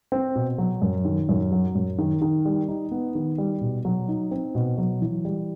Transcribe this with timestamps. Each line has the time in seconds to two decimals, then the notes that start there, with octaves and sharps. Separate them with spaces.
0.12 C4
0.35 B2
0.58 F#3
0.82 F#2
1.05 D#3
1.29 F#2
1.52 F#3
1.75 F#2
1.98 D#3
2.22 D#3
2.45 G3
2.68 D#4
2.91 B3
3.15 D#3
3.38 G3
3.61 B2
3.85 F#3
4.08 D#4
4.31 C4
4.55 B2
4.78 F#3
5.01 E3
5.25 G3